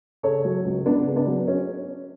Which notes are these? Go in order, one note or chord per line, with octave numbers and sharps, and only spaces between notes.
C#3 A4 C#5
F#3
C#2
C#2 B3 D4
C#3
B3 D4
F#3
C#4